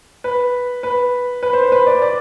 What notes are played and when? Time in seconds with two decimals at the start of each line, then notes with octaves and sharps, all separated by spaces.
0.24 B4
0.83 B4
1.43 B4
1.53 C5
1.63 C5
1.72 B4
1.87 D5
2.02 D5